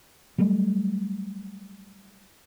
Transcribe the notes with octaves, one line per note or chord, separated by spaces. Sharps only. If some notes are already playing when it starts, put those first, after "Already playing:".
F#3 G3 A3